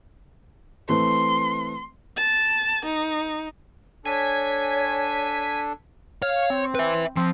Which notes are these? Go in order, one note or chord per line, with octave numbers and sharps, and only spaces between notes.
E3 A3 C4 C6
A5
D#4
D4 A4 C#5 G#5 B6
C#5 F5
C4
B4 E5
F3 C4